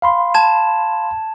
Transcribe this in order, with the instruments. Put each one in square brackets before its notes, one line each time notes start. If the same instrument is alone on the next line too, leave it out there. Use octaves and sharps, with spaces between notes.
[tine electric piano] F5 B5 C6
[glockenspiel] A5 G#6 E7